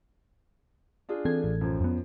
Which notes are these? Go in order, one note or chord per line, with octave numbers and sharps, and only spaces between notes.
D4 F4 G#4
E3 C4 A4 G#6
A1
F#2 F3
F2 B3